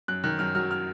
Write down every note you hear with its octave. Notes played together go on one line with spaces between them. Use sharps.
F#2 F#6
D#3 F#6
F#2 F6
F#3 F6
F6